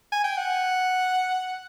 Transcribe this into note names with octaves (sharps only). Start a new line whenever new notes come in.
G#5
G5
F#5